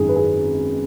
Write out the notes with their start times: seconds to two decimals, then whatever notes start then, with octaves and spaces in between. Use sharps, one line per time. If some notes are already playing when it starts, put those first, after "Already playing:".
Already playing: G#1 F#2 D#3 G#4
0.09 B4
0.16 G#4